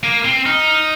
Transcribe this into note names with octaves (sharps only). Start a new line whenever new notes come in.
A#3 D#7
C4 D#7
D#4 F6
F6